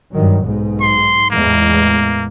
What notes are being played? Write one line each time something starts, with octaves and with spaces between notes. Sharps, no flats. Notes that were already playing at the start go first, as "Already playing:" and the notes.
G2 D#3 F#3
B1 G#2
C6
E2 A2 G#3 A#3